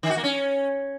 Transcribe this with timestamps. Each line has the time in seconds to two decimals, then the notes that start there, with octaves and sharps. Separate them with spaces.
0.03 D#3
0.10 F#4
0.17 A#3
0.24 C#4